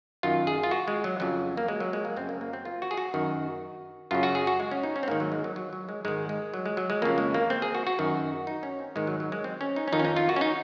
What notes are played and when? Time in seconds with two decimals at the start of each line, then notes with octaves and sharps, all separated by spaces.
0.23 F#2 D#3 F4
0.47 G#4
0.63 F4
0.71 F#4
0.88 G#3
1.04 F#3
1.20 F2 C#3 F#3
1.57 A#3
1.68 G#3
1.80 F#3
1.93 G#3
2.05 A#3
2.17 F#2 C#3 C4
2.29 A#3
2.41 A#3
2.53 C4
2.65 F4
2.82 F#4
2.91 G#4
2.97 F#4
3.14 F#2 D#3
4.11 F#2 C#3 F4
4.23 F#4
4.35 G#4
4.47 F#4
4.60 G#3
4.71 C#4
4.83 D#4
4.96 C#4
5.03 C4
5.08 G#2 D#3 A#3
5.20 F#3
5.32 G#3
5.44 F#3
5.56 F#3
5.73 F#3
5.89 G#3
6.05 G#2 D#3 G#3
6.29 G#3
6.54 F#3
6.66 G#3
6.77 F#3
6.90 G#3
7.02 F2 C#3 A#3
7.18 G#3
7.34 A#3
7.50 C4
7.62 G#4
7.75 F#4
7.87 F#4
7.99 F#2 D#3
8.47 D#4
8.63 C#4
8.79 C4
8.96 G#2 D#3 G#3
9.07 F#3
9.20 F#3
9.32 G#3
9.44 C4
9.61 C#4
9.76 D#4
9.88 C#4
9.92 F2 D#3 D#4
9.99 C#4
10.05 D#4
10.16 F4
10.29 F#4
10.36 C#4
10.41 D#4